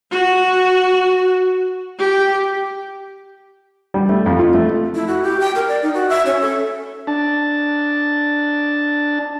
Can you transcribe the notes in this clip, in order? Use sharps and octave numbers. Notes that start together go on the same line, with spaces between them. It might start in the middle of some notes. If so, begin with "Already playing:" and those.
F#4
G4
G3
A3
F2
F4
A3
E4
F#4
G4
G5
A#4
D5
D#4
F#4
E5
C#4
A4
D4 A5